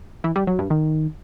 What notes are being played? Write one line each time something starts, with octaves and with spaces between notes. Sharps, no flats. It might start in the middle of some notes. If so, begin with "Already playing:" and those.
E3
G3
F#3
G2
D#3